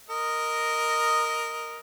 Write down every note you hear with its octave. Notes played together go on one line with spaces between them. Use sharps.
A#4 D#5